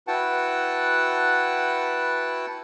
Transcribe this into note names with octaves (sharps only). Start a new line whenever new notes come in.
E4 F#4 B4 F#5 G5 A5